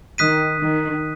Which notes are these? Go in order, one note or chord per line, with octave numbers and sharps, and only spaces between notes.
D#3 D#6 F#6 B6 D#7
D#3